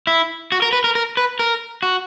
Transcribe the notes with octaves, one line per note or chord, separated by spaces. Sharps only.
E4
F#4
A#4
B4
A#4
A#4
B4
A#4
F#4